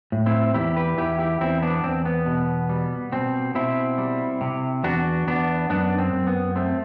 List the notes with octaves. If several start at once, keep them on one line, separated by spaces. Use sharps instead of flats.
A2
C4 E4
E2 E4 G4
G4 B4
E2 E4 G4
E4 G4
E2 C4 E4
B3 D4
E2 C4
B3
B2
G3
B2 C4
B2 C4 E4
G3
C3
E2 D4 F#4
E2 B3 D4
F#2 B3 D4
C4
F#2
B3
A3 C4